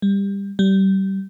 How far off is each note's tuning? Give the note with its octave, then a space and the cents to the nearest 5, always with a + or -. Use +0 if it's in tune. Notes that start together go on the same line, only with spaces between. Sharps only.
G3 +20
G3 -25